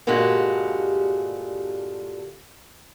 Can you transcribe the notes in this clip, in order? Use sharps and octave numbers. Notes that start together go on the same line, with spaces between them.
G2 A#2 D3 G#3 F#4 G4